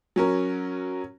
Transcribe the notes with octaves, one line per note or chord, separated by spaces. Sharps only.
F#3 C#4 A#4